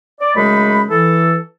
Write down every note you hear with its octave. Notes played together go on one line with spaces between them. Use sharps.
D5
F#2 C#3 G#3 A3 D#4 B5
E3 A4